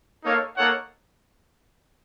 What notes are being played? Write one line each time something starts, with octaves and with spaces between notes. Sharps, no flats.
A#3 D#4 A4 C#5 F5
A#3 D#4 A4 C#5 F#5